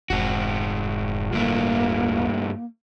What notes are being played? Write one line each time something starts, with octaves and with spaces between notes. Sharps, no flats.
F1 G#2 F#4
D1 G2 A3 A#3 E4